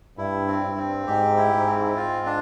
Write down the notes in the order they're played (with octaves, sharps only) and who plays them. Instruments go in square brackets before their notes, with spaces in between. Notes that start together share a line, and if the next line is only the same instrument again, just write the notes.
[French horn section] G2 [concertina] E4
[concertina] C4
[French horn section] G2
[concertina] C4
[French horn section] G#2 [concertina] G4
[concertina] E4
[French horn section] G#2
[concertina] C4
[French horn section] G#2 [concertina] F4
[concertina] D4